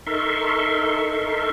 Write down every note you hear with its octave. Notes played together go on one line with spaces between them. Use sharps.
D#4 A4 A#4 E5 C6 C#6